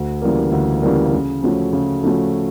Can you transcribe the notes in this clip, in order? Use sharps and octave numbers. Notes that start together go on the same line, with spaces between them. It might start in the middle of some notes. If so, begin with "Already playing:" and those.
Already playing: D2
C#3 E3 G3 A#3
D2
C#3 E3 G3 A#3
C#3
F3 A3 C#4 F#4
C#3
F3 A3 C#4 F#4